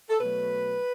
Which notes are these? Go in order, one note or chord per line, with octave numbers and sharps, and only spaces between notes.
A4
B2 F#3 A3 B4